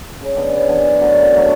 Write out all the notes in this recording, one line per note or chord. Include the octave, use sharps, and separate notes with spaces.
C#3
E3 B3 D4
C#3
E3 B3 D4
F#2
D3 F#3 A3
F#2
D3 F#3 A3